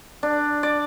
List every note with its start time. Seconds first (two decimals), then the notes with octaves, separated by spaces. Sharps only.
0.23 D4
0.63 D5